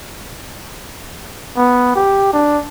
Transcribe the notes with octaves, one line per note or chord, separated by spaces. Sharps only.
B3
G4
D4